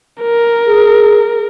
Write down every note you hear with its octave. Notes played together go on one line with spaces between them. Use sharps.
A#4
G#4